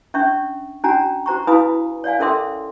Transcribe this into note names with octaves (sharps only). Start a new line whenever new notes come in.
C#4 D4 E5 C#6
C#4 D4 F#4 G#5 A#5
F#4 C5 A#5 C#6
E4 B4 F5 G#5 B5 D#6
C#5 D5 F5 G#5
C#4 A4 A#4 E5 C6 D6